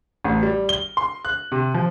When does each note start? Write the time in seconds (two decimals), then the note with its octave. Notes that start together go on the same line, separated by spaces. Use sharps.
0.24 A1
0.43 G3
0.69 G7
0.97 C6
1.25 F#6
1.52 C3
1.74 F3